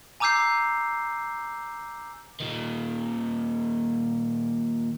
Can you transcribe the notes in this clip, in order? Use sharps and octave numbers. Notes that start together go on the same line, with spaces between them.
G#5 A#5 D6 E6 G6 C7
A#2 D#3